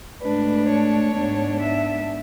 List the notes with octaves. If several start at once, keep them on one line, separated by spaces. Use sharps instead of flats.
A2 G#3 D4 B4
C#5
G#2 G#3 B3 D4
E5